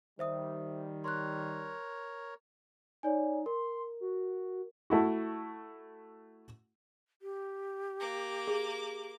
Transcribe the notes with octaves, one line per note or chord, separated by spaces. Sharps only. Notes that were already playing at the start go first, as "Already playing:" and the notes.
D#3 G3 C5 E5 D#6
A#4 C#5 C6 F#6
D#4 C#5 D5 G#5
A#4 C6
F#4
A3 E4 F#4
G4
A#3 D6
G#4